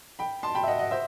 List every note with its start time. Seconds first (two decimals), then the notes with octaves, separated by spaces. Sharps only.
0.19 G5 B5
0.43 A5 C6
0.55 G5 B5
0.63 E5
0.67 D#5 F#5
0.79 D#5 F#5
0.91 C5 E5